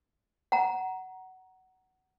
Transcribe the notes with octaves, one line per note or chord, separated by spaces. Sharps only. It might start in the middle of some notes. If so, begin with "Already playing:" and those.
F#5 A#5